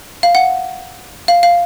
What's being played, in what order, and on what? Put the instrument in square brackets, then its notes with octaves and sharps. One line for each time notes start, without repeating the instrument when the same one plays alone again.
[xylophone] F5
F#5
F5
F5